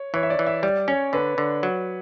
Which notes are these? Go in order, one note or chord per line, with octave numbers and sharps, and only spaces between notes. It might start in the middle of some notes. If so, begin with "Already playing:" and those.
Already playing: C#5
E3 C#5
E5
D5
E3
E5
G3 D5
C#4 C#5
D3 B4
D3
F#3